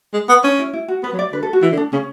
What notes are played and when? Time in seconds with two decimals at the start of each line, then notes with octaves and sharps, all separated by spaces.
0.14 G#3
0.29 B3
0.43 C#4 D4
0.59 E4
0.73 E4
0.88 F#4
1.03 B3 B4
1.13 F#3
1.19 D5
1.33 D3 B4
1.43 A4
1.53 F#4
1.62 E3 E4
1.72 D3
1.77 D4
1.93 C#3 C#4